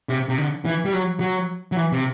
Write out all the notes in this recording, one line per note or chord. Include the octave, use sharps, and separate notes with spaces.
C3
C3
D3
E3
G3
F#3
F#3
F#3
E3
C3